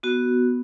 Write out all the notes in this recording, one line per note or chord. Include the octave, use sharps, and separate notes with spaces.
B3 F#4